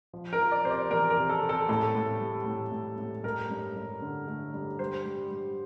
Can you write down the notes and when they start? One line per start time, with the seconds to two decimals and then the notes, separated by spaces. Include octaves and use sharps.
0.13 F3
0.33 A#4
0.39 F3
0.51 D5
0.65 C3 C5
0.71 D5
0.91 E2 A#4
1.10 A#4
1.17 C3
1.29 A4
1.43 C3
1.49 A4
1.69 A2 A4
1.95 A2
2.20 G3
2.46 A2
2.72 A2
2.98 A2
3.24 G2 A#4
3.50 G2
3.76 G2
4.02 D3
4.28 A3
4.54 G2
4.79 G3 C5
5.05 G3
5.31 G3